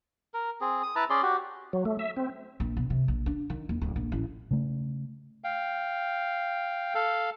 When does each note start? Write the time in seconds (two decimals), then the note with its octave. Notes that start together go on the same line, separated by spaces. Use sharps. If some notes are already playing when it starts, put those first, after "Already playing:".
0.34 A#4
0.61 C4 G#4
0.83 D#6
0.96 E4 B4 A5 A#5
1.10 C#4 G#4 D5 C6
1.23 F#4 G4
1.73 F#3
1.85 A3
1.99 E5
2.17 C4
2.60 A#1
2.77 B2
2.90 C3
3.08 A#1
3.26 D4
3.50 D#3
3.69 D#2
3.81 D1
3.96 A#1
4.12 A1
4.51 C#3 A3
5.44 F5 G5
6.95 A4 F5